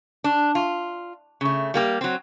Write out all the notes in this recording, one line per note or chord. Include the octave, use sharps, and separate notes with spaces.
D4
F4
C#3 A3
G3 A#3 G4
F#3 C4